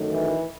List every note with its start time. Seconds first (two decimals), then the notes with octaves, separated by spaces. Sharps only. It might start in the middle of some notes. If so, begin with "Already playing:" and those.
Already playing: F#2 D#3 F#3 A3
0.11 E3 E4